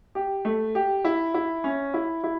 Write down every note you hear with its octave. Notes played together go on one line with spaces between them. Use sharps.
G4
A3
G4
E4
E4
C#4
E4
E4